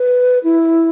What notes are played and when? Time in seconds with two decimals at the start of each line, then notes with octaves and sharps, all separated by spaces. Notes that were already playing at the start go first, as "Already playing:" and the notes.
Already playing: B4
0.44 E4